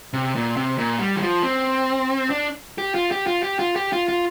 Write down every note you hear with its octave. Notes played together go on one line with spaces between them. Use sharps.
C3
A#2
C3
A#2
G3
E3
F3
C4
D4
G4
F4
G4
F4
G4
F4
G4
F4
F4